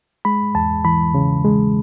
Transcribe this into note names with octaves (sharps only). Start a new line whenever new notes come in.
G#3 B5
E2 A5
E3 B5
C#3
G#3